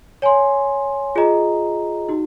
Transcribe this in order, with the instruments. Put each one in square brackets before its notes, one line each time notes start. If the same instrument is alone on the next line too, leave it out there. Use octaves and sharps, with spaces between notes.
[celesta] C#5 G#5 C6
F4 G#4 D#5 A#5
D#4 F#4